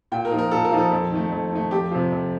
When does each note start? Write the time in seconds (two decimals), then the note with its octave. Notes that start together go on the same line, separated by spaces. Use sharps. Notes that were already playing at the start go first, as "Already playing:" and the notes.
0.12 A#2 G5
0.25 A#4
0.31 F3 A#3 D#4
0.38 A#4
0.51 A#2 A4
0.65 A#4
0.72 F3 A#3 D#4
0.78 A4
0.92 F2
1.12 D#3 A3
1.32 F2
1.52 D#3 A3
1.71 F2 G4
1.91 C3 F3
2.12 F2